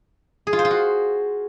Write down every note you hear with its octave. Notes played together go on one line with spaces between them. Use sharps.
G#4
F4
C5
F4
F#4